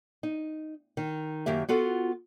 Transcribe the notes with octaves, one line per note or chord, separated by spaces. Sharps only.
D#4
D#3
F#2 D#3 A#3 G4 E5
B3 F4 F#4 A4